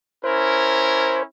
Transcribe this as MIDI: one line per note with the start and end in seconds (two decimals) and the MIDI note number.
0.24 1.21 61
0.24 1.21 64
0.24 1.21 70
0.24 1.23 72